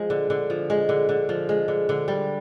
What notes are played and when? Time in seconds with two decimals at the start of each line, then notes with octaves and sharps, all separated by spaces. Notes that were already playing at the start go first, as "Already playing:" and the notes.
Already playing: F3 G#3
0.10 D3
0.30 D3
0.50 F3
0.70 G#3
0.89 D3
1.09 D3
1.29 F3
1.49 G#3
1.68 D3
1.89 D3
2.08 G3